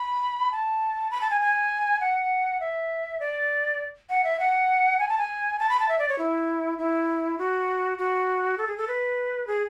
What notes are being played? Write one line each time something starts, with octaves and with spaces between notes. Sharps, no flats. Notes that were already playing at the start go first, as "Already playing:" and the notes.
Already playing: B5
A5
B5
A5
G#5
G#5
F#5
E5
D5
F#5
E5
F#5
G#5
A5
G#5
A5
B5
A5
E5
D5
C#5
E4
E4
F#4
F#4
A4
G#4
A4
B4
G#4